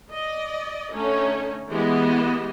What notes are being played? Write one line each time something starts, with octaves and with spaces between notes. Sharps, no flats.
D5 D#5
D3 A3 C#4 D#4
E3 G#3 B3 G4 D#5